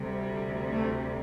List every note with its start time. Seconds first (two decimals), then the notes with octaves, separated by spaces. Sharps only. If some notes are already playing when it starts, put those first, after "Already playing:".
Already playing: D2 C3 G3
0.73 A3